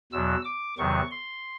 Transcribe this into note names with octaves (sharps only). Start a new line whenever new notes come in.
E2 B2 F#3 E6
D6
E2 C3 D#3 F#3 C#6
C6